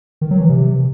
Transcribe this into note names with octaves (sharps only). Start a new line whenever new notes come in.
D#3
F#3
E3
C3